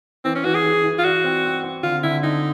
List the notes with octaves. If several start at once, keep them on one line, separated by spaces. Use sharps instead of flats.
E3 C4
C#4
E3 F#4
G#4
E3
E3
F4
F#4 D5
C4
C4
C4
D3 F4
D3 E4
D3 D#4